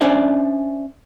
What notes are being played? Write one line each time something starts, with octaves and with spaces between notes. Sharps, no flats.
C#4 D4 C5 D5 E5